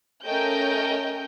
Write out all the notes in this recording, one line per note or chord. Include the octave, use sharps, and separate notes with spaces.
A3 C#4 A#4 D#5 G5 G6